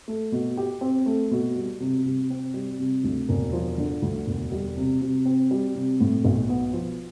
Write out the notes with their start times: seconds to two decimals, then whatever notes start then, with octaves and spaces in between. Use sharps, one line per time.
0.08 A3
0.32 B2
0.57 G4
0.81 C4
1.06 A3
1.31 B2
1.56 G3
1.80 C3
2.05 C3
2.30 C4
2.54 G3
2.79 C3
3.04 D2
3.29 E1
3.53 F3
3.78 D3
4.02 D2
4.27 E1
4.52 G3
4.77 C3
5.01 C3
5.25 C4
5.51 G3
5.75 C3
6.00 A2
6.25 B1
6.49 B3
6.73 F3